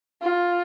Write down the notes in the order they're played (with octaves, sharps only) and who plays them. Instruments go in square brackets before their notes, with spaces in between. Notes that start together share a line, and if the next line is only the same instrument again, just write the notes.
[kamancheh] F4